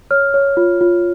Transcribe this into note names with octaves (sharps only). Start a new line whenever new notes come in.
C#5 F6
C#5
F4
F4